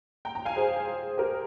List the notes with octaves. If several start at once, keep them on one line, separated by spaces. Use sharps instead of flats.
G5 A#5
G5 A#5
F5 G#5
G#4 C5
G4 A#4